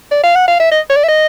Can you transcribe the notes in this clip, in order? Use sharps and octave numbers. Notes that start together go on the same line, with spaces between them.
D5
F5
F#5
F5
E5
D#5
C#5
D5
E5
D#5